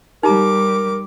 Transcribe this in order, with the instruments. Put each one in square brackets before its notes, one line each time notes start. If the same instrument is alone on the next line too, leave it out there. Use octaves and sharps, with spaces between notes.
[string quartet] G3 D6 [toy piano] D#4 G4 A#5 [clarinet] A#4